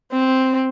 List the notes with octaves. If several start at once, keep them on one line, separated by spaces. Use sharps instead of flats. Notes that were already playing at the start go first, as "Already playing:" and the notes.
C4